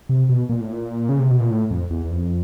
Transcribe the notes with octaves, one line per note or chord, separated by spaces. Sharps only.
C3
B2
A#2
A2
A#2
C#3
C3
B2
A#2
A2
F2
E2
E2
F2